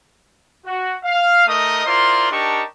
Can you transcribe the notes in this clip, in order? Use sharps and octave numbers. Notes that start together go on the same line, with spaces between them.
F#4
F5
A3 D#4 A#4 D#5 D#6
E4 F4 A#4 C5 D5 C6
D4 D#4 G4 A#4 A5 C#6